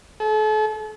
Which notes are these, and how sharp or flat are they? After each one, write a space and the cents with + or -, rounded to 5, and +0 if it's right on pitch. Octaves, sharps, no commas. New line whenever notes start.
A4 -40